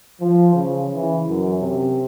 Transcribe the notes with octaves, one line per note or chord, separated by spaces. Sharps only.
F3
C#3
E3
F#2
C3